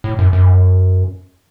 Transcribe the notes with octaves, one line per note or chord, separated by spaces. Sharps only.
A2
F#2
F#2